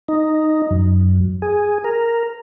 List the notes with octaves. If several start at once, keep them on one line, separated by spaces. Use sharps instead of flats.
D#4
F#2
G#4
A#4